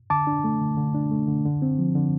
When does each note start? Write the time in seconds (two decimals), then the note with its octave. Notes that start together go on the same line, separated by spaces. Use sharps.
0.10 D3 A5 D6
0.27 D4
0.44 A3
0.61 D3
0.77 D3
0.94 D4
1.11 A3
1.28 D3
1.45 D3
1.62 C4
1.79 F3
1.95 D3